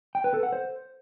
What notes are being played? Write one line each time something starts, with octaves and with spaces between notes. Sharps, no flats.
G5
B4
A4
F#5
C5